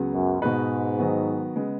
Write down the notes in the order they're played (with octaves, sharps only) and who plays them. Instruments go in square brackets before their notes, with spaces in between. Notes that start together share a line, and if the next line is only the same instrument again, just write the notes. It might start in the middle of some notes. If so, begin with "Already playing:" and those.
Already playing: [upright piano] C#2 C#3 F#3 B3
[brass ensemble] F#2
[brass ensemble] G#2 [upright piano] B2 B3 D#4 F#4 B4
[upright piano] D#3 F#3 B3 F#4
C#3 G#3 B3